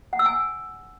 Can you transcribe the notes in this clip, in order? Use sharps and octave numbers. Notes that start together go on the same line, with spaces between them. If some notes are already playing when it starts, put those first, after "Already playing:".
F#5
E6
G#5